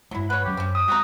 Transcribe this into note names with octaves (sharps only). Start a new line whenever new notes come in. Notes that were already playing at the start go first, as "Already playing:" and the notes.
G2 F#3 G#3 A3 E4
B4 C#5 F#5
D2 F#3 C#4 G4
F#2 C4 C#4
D#6
G#3 C4 F#4 G4 G5 A#5